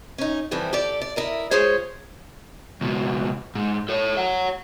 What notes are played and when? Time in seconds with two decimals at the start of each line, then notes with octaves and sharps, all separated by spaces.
0.18 C#4 D#4
0.51 F2 E3 G3 C4
0.73 G4 A4 D5
1.01 D5
1.16 E4 A#4 D#5
1.51 G#3 F4 G#4 C5 C#5
2.81 C#2 B2
3.55 G#2
3.89 A4 C#5
4.17 C#5 F#5